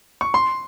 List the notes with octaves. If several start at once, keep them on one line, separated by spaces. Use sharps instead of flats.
C#6
C6